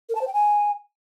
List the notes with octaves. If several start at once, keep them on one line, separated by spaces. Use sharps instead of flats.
A#4
A5
C5
G5
G#5